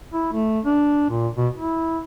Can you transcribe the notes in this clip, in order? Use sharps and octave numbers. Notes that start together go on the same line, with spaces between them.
E4
A3
D4
A#2
B2
E4